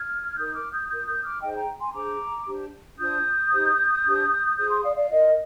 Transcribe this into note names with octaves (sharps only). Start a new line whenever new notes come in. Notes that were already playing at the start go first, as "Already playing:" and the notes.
Already playing: F6 G#6
D#4 A#4 D#6 G6
D6 F6
D#6 G6
F4 A#4 D#6 G6
D#6 G6
D6 F6
D#4 G#4 C5 D#5 G5
G5 A#5
G#5 C6
D4 G#4 C5 A#5 D6
D4 G4 C5
D4 F4 C5 D#6 G6
D#4 G4 C5
D4 G4 C5
F4 G#4 C5 D#6 G6
C6 D#6
D5 F5
D5 F5
F4 A#4 D#5